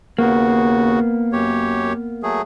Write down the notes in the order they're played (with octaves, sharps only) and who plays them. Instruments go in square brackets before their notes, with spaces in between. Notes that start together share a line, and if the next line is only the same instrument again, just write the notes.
[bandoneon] D#2 C#3 F#4 [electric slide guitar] A#3 B3
[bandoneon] F#2 G4 C#5
F#3 A3 G#4